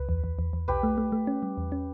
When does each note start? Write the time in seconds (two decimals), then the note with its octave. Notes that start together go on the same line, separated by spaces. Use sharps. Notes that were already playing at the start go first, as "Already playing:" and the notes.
Already playing: C#2 B4
0.09 E2
0.24 E2
0.39 E2
0.53 E2
0.68 B1 G4 B4
0.83 A3
0.98 A3
1.12 A3
1.27 C#4
1.43 G3
1.58 E2
1.72 C#4